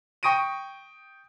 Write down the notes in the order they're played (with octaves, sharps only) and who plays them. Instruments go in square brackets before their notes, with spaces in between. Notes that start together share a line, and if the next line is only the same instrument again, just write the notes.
[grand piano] G5 C#6 D#6 A#6 D7 D#7